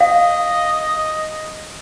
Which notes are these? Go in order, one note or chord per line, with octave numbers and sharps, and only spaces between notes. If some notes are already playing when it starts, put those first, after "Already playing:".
D#5 F5